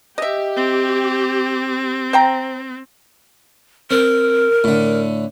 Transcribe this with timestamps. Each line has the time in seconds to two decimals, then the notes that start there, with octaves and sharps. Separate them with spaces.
0.18 G4 D#5 E5
0.56 C4
2.13 C5 G5 A#5
3.91 C4 A#4
4.64 A2 D3